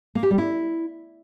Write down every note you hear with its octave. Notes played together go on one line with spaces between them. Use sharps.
A#3
G4
G3
E4